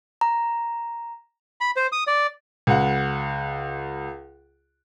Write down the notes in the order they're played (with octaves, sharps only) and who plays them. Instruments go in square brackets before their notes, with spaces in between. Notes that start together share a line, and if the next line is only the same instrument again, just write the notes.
[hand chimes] A#5
[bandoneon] B5
C5
D#6
D5
[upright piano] C#2 F#5